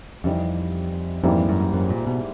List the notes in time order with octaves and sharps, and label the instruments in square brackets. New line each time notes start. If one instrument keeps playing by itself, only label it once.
[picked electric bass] F2 [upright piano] E3 G3 C4 D#4
[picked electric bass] F2 [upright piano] G#2 E3 G3 A#3
[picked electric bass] F#2
F#2
A#2
B2